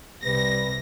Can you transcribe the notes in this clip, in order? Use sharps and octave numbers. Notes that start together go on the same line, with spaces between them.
C2 C3 G3 B4 A#6